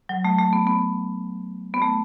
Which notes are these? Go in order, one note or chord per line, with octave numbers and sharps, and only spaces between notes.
F#3
A3
A3
B3
B3
B3
A3